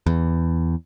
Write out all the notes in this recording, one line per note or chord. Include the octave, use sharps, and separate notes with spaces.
E2